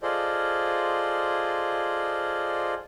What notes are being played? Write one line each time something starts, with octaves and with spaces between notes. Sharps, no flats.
F4 G#4 A4 C5 D5 D#5